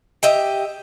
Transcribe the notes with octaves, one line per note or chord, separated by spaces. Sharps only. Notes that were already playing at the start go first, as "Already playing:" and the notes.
G4 D#5 E5